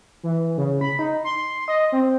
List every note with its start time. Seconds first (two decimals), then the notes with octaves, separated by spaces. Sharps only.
0.23 E3
0.58 C#3
0.81 B5
0.99 D#4
1.24 C6
1.68 D#5
1.92 C4